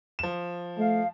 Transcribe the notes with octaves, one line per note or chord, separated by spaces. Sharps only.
F3 E7
A3 F5